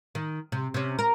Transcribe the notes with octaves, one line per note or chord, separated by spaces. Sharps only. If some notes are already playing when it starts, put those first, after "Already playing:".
D#3
C3
C3 C#4
A#4